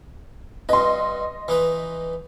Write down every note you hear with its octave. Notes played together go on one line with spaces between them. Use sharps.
G2 B4 D#5 C6
E3 D#4 B4